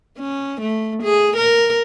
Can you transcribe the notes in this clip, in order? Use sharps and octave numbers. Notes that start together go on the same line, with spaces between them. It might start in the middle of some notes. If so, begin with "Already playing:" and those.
C#4
A3
G#4
A#4